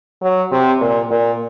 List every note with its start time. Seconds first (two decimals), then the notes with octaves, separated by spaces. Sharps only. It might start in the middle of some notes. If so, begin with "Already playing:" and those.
0.22 F#3
0.52 C3
0.81 A#2
1.11 A#2